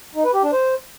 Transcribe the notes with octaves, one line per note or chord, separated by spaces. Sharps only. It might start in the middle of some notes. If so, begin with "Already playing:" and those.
D#4
B4
G4
D4
C5